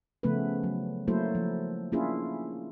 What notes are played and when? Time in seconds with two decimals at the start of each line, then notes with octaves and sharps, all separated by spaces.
0.23 C#3 F3 A3 B3 C#4 B4
0.63 F#3
1.08 F#3 A3 A#3 E4 A4 C5
1.35 F3
1.92 A#3 C#4 D4 E4 F4 G#4